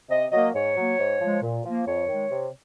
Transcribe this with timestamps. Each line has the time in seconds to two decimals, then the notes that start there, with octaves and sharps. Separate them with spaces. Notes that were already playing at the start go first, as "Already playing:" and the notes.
0.10 C3 D#5
0.32 F#3 A#3 D#5
0.54 G#2 C#5
0.76 F#3 A#3
0.99 G#2
1.21 F3 G#3
1.42 A#2
1.65 F3 A#3
1.86 F2 C#5
2.08 D#3 G#3
2.31 C3